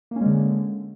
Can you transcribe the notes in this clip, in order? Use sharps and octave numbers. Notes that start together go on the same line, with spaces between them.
D3 G#3 A#3 C#4